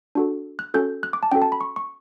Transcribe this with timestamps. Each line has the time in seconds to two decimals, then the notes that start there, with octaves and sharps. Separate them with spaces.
0.15 D4 F#4 A4
0.59 F#6
0.74 C#4 F#4 A4 G6
1.03 F#6
1.13 D6
1.23 A5
1.32 C#4 F#4 A4 G5
1.42 A5
1.52 B5
1.61 C#6
1.76 C#6